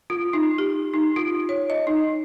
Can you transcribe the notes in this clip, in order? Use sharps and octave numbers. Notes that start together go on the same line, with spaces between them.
F4
D#4
G4
D#4
F4
C#5
D#5
D#4